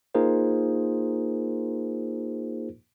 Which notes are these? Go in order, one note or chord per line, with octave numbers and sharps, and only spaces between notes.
A#3 D#4 F4 G#4 A#4 C5